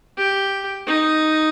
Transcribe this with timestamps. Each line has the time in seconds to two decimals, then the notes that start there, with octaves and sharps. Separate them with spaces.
0.17 G4
0.87 D#4